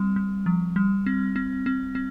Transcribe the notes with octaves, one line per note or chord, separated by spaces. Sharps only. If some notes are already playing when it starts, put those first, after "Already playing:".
Already playing: G3 C4
G3
F3
G3
C4
C4
C4
C4